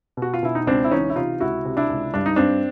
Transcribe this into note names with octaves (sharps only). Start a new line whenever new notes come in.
B2
F#4
F4
B2 E4
D#4
C#2 C4 D4
E4
E3 C#4 D#4
E4
C3 D#4 F4
C#2 E4 F#4
C3
D4 E4
C#2
G2 D4
D#4
G2 C4 D4